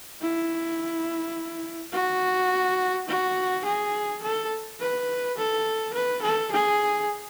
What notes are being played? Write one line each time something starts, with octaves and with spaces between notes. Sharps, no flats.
E4
F#4
F#4
G#4
A4
B4
A4
B4
A4
G#4